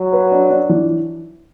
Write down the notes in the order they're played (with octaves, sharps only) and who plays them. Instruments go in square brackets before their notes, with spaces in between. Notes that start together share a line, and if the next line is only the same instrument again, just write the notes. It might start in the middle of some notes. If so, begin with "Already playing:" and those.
Already playing: [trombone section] F#3
[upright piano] B4
D4
D4
E3